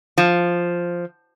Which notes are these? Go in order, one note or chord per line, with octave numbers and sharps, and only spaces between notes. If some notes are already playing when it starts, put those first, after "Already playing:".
F3